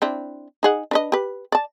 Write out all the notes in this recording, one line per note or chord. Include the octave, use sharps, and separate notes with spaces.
C4 D4 E4
D#4 G#4 F#5
D4 B4 D#5
G4 B4
D5 A5